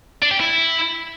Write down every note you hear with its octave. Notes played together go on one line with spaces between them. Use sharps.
D4
G4
E4